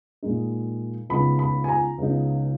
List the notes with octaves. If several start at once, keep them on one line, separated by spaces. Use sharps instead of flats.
A#2 G#3 D#4
C#2 C#3 G#3 B3 D#4 B5
B5
G#5
A#5
C#2 C#3 G#3 B3 D#4